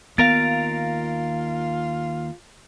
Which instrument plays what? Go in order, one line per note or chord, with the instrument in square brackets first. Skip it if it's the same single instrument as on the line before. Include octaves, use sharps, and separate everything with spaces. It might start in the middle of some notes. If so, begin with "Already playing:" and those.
[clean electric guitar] D#2 A#4 F5 [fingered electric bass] B3 [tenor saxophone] F4 [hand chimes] A6 D7